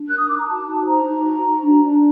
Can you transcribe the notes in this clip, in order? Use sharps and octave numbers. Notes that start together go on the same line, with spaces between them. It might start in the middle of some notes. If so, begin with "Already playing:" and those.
Already playing: D4
A#4 F#6
D#6
D#4 D6
A#5
F#4 A5
D#4
C5 A#5
D#4
F#4
F#4
D4
D4